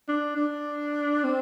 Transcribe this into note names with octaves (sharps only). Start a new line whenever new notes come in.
D4
D4
C4